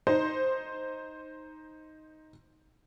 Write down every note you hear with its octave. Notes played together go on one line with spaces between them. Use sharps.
D#4 C5